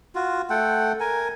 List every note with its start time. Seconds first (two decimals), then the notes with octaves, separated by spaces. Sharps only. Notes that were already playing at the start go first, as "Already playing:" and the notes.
0.15 F4 F#4
0.50 A3 A4 F#5 G5
1.00 A#4 G#5